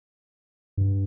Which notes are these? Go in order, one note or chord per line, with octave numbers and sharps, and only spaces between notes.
G2